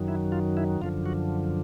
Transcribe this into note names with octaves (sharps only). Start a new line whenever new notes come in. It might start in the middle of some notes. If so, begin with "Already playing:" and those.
Already playing: F#2 D#3 F#3
E4
F4
E4
F#2 D3 F3 F4
F#4